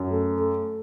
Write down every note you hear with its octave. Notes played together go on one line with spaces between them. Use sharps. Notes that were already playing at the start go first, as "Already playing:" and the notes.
Already playing: F#2
A3
A3